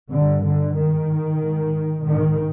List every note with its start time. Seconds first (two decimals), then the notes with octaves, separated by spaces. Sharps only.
0.10 G2 D3
0.42 D3
0.75 G#2 D#3
1.39 G#2
2.04 G#2 D#3